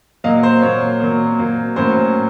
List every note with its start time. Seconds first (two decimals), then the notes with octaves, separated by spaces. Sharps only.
0.24 A#2 F#3 A#3 D#5 F5
0.43 C5
0.62 A#2 F#3 A#3 C#5
1.00 A#2 F#3 A#3
1.38 A#2 F#3 A#3
1.76 A2 F#3 A#3 C#4 C5